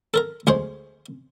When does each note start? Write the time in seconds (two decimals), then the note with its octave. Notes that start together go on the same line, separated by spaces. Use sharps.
0.14 A4 A#4 A#5
0.47 D2 G#3 G#4 C5 C#6